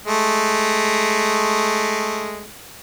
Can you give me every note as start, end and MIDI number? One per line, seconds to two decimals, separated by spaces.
0.06 2.46 56
0.06 2.46 57